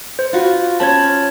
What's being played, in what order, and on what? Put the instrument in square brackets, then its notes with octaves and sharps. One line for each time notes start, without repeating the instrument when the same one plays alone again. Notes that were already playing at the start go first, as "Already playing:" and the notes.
[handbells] C5
[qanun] F4 F#4 B4
[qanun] C#4 C5 B5 [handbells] A5 G#6